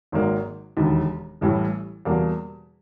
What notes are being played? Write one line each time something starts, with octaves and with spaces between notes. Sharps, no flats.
G#1 G#2 D#3 F#3 A#3
E1 D#2 D3
A1 A2 E3 G3
E2 B2 G3 A#3